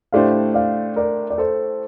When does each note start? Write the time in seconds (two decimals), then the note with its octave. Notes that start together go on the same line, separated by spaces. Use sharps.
0.12 A2 A3 D4 G4 C5 D5 F5
0.54 D5 F5
0.96 A#4 D5
1.30 D5
1.38 A4 C5